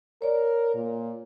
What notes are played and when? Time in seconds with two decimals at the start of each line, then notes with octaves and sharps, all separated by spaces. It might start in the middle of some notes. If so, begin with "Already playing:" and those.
0.22 A#4 C#5 D5
0.75 A#2